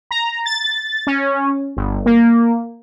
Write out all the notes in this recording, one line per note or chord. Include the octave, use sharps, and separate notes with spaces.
A#5
A6
C#4
G1
A#3